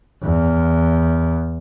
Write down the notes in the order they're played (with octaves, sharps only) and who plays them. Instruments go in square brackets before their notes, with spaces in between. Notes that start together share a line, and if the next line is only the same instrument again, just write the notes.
[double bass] E2